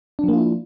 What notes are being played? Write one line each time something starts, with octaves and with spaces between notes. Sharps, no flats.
F3 A#3 D4 E4 F4